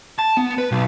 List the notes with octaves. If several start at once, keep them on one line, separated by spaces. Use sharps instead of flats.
A5
B3
B4
B1